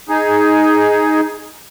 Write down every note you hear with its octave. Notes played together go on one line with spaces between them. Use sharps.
D#4 G#4